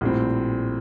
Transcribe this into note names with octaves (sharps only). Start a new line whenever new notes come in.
A#1 A2 G3 C4